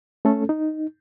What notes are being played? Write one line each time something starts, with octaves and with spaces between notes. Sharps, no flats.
A3 C#4 A4
D#4